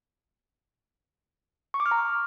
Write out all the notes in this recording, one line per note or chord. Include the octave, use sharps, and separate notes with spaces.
C#6
D6
F6
A#5